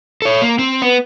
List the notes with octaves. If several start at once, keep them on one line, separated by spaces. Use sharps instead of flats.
A4 C#5
A#3
C4
B3